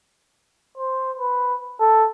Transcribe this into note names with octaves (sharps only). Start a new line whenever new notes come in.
C5
B4
A4